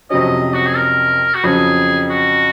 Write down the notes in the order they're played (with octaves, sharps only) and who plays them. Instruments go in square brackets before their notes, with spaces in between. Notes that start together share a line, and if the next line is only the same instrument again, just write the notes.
[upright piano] F2 C3 F#3 C#4 [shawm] D#5
[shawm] F#4
G#4
A#4
F#4
[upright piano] F2 C#3 F#3 [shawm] G#4
[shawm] F#4